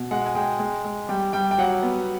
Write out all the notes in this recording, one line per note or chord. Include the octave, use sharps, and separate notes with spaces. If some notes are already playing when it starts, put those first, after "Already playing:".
Already playing: B2
G#3 F#5
G#5
G#3 G5
G#3
G#3
G3 G5
G3 G5
G5
F#3 F#5
B3